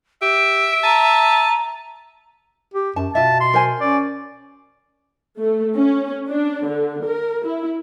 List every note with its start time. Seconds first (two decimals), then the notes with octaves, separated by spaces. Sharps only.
0.22 G4 E5 D7
0.84 A5 A#5 D#7
2.74 G4
2.96 F#2 A5
3.15 B2 F4 E5 A5
3.40 C6
3.54 A#4 C5 G#5
3.80 C#4 D5
5.40 A3
5.77 C#4
6.28 D4
6.66 D3
7.04 A#4
7.46 E4